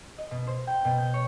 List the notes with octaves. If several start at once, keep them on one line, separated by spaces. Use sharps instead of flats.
D#5
B2
C5
G5
B2
G6
C#5